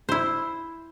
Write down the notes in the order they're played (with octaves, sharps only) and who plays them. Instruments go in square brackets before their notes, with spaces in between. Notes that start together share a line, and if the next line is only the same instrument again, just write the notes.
[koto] E4 C5